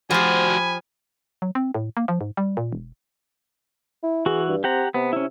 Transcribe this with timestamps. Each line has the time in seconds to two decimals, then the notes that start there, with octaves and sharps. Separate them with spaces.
0.11 F3 F#4 G4 C5 G#5 B5
1.42 F#3
1.55 C4
1.75 A2
1.97 A#3
2.08 F3
2.21 G#2
2.37 G3
2.57 A#2
2.73 E1
4.03 E4
4.26 E3 F#4 G#4
4.48 G2
4.64 C4 G4 F#5 A#5
4.94 C3 B3
5.13 C#4 E4